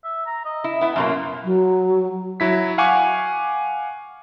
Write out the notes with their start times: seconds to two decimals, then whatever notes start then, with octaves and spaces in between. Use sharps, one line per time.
0.04 E5
0.26 A#5
0.45 D#5
0.64 E4
0.81 B3 E4
0.96 F#2 B2 A#3 C6
1.44 F#3
2.40 F#3 E4 B6
2.78 F5 F#5 G#5 C#6 D6